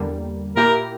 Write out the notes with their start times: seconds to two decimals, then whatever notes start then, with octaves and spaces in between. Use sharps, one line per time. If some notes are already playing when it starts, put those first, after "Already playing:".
Already playing: E2 D3 G3 A#3
0.56 A#2 A#3 E4 G4 A#4